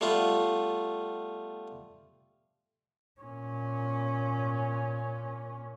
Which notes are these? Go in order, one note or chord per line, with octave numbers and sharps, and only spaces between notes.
G3 A3 B3 F4 B4
A#2 C#4